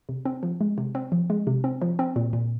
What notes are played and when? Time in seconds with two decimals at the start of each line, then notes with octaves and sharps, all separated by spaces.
0.09 C3
0.25 C4
0.43 F3
0.61 G#3
0.78 C3
0.95 C4
1.12 F3
1.30 G#3
1.47 C3
1.64 C4
1.82 F3
1.99 C4
2.16 A#2
2.33 A#2